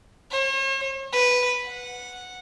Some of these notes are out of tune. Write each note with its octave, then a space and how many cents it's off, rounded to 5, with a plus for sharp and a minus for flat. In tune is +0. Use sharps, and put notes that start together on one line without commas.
C#5 -45
B4 +0
F#5 -10